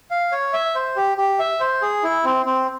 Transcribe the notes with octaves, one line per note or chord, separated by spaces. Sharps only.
F5
C#5
E5
C5
G4
G4
E5
C5
G#4
E4
C4
C4